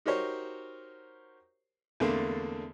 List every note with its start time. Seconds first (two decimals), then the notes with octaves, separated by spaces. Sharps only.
0.06 D#4 F#4 G4 A#4 C5 C#5
2.00 E2 D3 A3 A#3 C4 D4